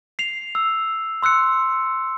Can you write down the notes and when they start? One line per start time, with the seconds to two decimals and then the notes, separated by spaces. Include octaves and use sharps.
0.19 C7 F7
0.55 E6
1.22 C6 E6 F#6 C#7